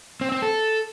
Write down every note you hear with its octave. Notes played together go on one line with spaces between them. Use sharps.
C4
C4
A4